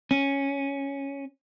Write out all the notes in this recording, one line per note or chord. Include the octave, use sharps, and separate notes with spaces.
C#4